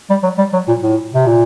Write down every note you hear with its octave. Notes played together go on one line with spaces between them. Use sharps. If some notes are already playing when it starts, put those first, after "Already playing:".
G3
F#3
G3
F#3
A#2
A2
C3
A#2